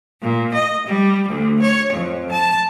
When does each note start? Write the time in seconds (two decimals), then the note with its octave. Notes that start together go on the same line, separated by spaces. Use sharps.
0.21 A#2
0.53 D#5
0.85 G3
1.27 D2
1.61 C#5
1.91 F2
2.30 A5